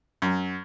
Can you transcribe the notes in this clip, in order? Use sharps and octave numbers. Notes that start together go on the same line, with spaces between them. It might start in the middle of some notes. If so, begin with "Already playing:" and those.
F#2